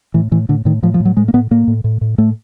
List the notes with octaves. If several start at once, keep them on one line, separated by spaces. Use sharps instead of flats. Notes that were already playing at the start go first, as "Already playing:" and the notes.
A2 E3
A2 E3
A2 D3
A2 D#3
A2 F3
F3
A2
F#3
A2 G#3
A#3
A2 B3
A2 A#3
A2
A2
A2
A2 A3